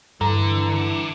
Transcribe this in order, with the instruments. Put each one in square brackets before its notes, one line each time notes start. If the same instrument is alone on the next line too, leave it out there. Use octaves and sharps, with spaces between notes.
[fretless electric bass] G2 [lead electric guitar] D3 [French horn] E3 [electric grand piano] A4 A#5